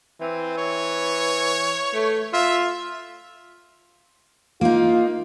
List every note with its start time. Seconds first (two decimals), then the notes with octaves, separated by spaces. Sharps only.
0.21 E3 C4
0.57 C#5
1.94 A3
2.33 F4 E5
4.61 A#3 D#4 F4